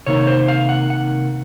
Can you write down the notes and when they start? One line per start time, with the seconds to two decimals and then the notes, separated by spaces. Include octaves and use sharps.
0.06 C3 D#3 A#3 D#4 C#5
0.27 C5
0.48 F5
0.69 F#5
0.90 F#5